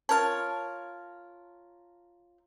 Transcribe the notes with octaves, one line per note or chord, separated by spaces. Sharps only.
F4 A#4 C#5 A5 F6